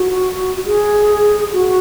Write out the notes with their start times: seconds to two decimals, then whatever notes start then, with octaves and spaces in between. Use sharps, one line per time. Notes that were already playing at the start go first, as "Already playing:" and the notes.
Already playing: F#4
0.66 G#4
1.53 F#4